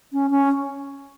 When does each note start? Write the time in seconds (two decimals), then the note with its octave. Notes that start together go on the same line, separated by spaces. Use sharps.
0.13 C#4
0.31 C#4